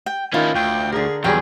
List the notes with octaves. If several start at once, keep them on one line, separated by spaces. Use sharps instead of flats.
G5
D#3 C#4 E4 F4
D2 G5
D3 G#4 A#4
E2 F#3 G3 G#4 G5